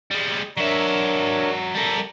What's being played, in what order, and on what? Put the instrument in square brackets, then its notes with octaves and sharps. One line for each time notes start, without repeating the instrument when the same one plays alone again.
[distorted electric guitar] G3 G#3
[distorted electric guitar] F#3 E5 [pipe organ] D4 A#4 C#5
[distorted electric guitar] G3 A#4 [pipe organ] A4